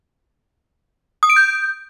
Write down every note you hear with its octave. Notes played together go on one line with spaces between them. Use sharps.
D#6
D7
G6